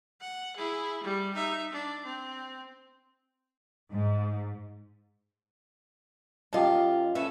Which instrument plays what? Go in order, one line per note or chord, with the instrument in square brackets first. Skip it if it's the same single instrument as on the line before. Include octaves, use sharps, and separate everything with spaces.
[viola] F#5
E4 G#4
G3
D#4 E5
D4
C4
[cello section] G#2
[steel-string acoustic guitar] F#2 F4 [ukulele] G4 D#5 A5
[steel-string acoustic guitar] C#4 A4 E5 [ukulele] B4